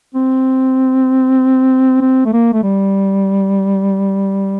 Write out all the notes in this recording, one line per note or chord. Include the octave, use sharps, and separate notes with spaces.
C4
C4
A3
A#3
A3
G3